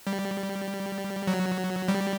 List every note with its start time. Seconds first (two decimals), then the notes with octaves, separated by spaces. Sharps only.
0.07 G3
1.27 F#3
1.88 G3